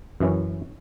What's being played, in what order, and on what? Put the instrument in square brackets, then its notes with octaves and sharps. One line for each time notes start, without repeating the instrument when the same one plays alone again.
[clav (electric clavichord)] F#2 E3 C#4